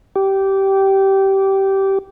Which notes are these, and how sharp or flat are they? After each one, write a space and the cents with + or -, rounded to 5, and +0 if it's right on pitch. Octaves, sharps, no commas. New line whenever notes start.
G4 -15